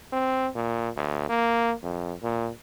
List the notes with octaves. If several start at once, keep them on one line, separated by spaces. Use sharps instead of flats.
C4
A#2
D2
A#3
F2
A#2